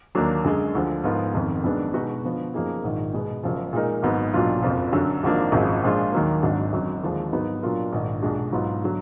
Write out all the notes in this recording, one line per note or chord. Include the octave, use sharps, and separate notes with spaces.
D#2 D3 F#3 A#3 D4
F#2 D3 G#3
D2 D3 F3
G#2 F3 B3 F4 A#4
F#1 F2 D#3
F#2 D#3 G#3 B3 D4
B2 G#3 D#4 F#4 B4
D3 F3 B3
F#2 F3 A#3 D#4 G#4
A#1 G#2 D#3
B2 G#3 B3
F#1 F#2 F3
A#2 G#3 D#4 A#4
G#1 G#2 F#3 B3
B1 A#2 F#3 D4 F4
F#1 F2 F3
F#2 D3 F#3
G#1 G#2 F3 A#3 D4
G#1 F#2 F3 G#3
A#2 F3 G#3 D4 F4
D#2 D#3 F#3 A#3
G#1 G#2 F#3 D4
G#1 F#2 D3 F#3
D#2 D3 F3 G#3 D4
G#2 F#3 B3 D#4 A#4
A#2 F#3 D4 F4 A#4
A#1 G#2 D#3
B1 A#2 G#3 D4 F#4
G#2 F#3 B3 F4
D3 F#3